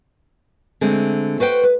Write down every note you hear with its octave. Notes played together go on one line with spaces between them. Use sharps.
D3 G#3 A3 C4
F#4 B4 C5 G5
B4